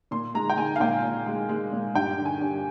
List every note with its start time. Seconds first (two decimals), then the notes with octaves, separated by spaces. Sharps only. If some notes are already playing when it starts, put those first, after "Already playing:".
0.11 A#2 C6
0.34 G#3 A#5
0.50 G5
0.57 G#3 G#5
0.76 F5
0.80 A#2 G5
1.03 A#2
1.26 G#3
1.49 G#3
1.72 A#2
1.95 G2 G5
2.18 D3
2.25 G#5
2.41 G2